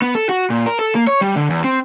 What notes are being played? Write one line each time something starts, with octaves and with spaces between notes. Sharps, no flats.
B3
A4
F#4
A#2
A#4
A4
A#3
C#5
G3
D3
E2
C4